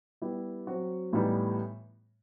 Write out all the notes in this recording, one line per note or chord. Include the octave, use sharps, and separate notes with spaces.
G3 B3 E4 G4
F#3 C4 F#4
A2 E3 G3 B3 D#4